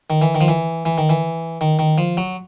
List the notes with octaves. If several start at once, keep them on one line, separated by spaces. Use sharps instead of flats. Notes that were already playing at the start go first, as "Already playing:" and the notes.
D#3
E3
D#3
F3
E3
E3
D#3
E3
D#3
D#3
F3
F#3